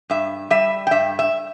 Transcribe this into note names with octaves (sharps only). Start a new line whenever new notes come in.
G2 E5
G3 E5
G5
G2 E5
E5